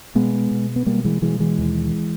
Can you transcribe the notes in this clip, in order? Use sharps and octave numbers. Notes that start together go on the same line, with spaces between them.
B2 G#3 B3
B2
B3
B2 G3 A#3
E3 G#3
B2 E3 G#3
E3 G#3
D#2